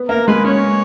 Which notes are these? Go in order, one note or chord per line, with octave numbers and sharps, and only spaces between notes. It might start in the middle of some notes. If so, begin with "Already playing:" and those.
Already playing: B3
A#3 A#4
G#3 B4
C#4 C#5